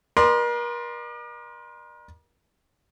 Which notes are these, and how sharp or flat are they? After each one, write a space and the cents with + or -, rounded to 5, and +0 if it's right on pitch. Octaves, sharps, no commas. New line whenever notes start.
A#4 +40 D5 +40 C6 -5